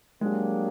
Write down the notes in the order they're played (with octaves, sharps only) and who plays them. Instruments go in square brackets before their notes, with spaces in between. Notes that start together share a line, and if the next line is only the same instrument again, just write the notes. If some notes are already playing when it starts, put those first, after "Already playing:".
[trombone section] F#3 A#3 D4 G4 [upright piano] G#3